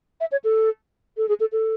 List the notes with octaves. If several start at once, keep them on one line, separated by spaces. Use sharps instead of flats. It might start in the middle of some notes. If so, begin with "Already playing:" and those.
E5
C#5
A4
A4
G#4
A4
A4